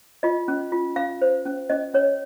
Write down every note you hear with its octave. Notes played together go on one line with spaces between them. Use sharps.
F4 D#5
C#4
F4
C#4 F5
C5
C#4
C#4 D#5
C#4 C#5